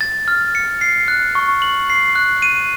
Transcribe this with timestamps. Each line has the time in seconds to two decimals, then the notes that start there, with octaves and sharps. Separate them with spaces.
0.01 A6
0.28 F6
0.55 C#7
0.81 C7
1.08 F#6
1.35 C#6
1.62 F#7
1.90 C7
2.15 F#6
2.42 D#7